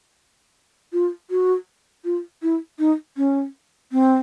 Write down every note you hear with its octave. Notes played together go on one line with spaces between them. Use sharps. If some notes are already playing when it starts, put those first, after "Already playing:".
F4
F#4
F4
E4
D#4
C#4
C4